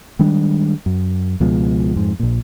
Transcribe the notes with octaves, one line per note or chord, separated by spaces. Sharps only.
D#3 G3 G#3 D4
F#2
C#2 B2 F3 G#3
F2 G#2
A#1 A#2